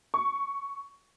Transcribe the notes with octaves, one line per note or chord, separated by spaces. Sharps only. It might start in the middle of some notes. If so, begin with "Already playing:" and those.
C#6